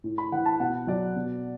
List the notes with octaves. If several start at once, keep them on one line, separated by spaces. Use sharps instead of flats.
A2
B5
E3 F#5
A5
B2 F#5
F#3 D5
B2